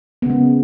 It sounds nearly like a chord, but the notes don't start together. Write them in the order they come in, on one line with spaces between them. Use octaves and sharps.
B3 C#3 G#3